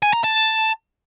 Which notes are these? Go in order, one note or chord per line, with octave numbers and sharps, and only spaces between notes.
G#5
A#5
A5